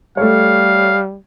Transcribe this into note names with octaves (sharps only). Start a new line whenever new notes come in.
G3 A3 C#5 F5